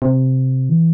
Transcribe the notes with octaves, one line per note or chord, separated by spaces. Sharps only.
C3
E3